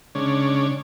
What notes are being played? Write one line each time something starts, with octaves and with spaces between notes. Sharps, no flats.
C#3 G#3 C#4 D4